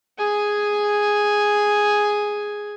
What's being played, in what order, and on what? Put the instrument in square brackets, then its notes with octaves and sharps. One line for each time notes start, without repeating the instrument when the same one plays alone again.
[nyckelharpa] G#4 G#5